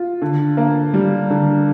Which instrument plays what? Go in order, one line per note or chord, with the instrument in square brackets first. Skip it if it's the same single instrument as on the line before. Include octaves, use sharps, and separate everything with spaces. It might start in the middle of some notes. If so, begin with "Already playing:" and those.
Already playing: [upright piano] F4
D3
A#3
G3
D3